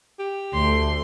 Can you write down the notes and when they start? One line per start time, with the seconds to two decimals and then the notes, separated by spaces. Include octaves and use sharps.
0.19 G4
0.54 D2 A3 C6